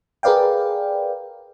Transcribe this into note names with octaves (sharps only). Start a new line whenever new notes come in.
G#4 A#4 B4 D5 F5 G5